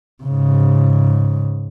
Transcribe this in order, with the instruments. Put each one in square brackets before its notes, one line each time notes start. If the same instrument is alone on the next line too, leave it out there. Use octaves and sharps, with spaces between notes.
[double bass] G#2 C#3